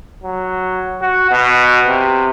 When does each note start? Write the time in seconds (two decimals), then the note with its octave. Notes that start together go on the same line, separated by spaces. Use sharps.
0.23 F#3
1.01 F#4
1.31 B2
1.88 C3